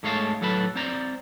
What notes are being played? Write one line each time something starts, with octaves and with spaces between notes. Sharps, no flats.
G#2 A3 G#4 C#5 F5 A5
A2 F#3 A4 B4 A5 B5
C4 C5 D5 A#5